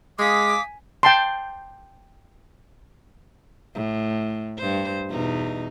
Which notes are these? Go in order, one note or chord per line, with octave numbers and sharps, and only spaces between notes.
G#3 F5 G#5 D6 D#6 B6
G5 A5 C6
A2
G2 C5
E2 B2 D#4